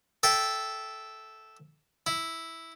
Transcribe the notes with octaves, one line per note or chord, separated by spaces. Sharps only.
A4 E5 G5
E4